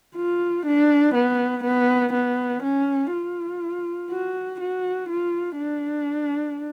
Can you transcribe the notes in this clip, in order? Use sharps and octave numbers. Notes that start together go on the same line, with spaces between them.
F4
D4
B3
B3
B3
C#4
F4
F#4
F#4
F4
D4